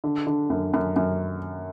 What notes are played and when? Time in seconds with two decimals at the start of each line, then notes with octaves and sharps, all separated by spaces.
0.04 D3
0.27 D3
0.50 F#2
0.74 F#2
0.96 F#2